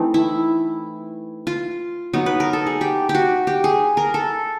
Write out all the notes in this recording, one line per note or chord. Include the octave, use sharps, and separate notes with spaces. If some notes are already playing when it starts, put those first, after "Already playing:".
Already playing: E3 A3 C4 D#4
E4
F4
F#3 B3 D#4
B4
A#4
A4
G#4
G4
G4
F#4
G4
G#4
A#4
A4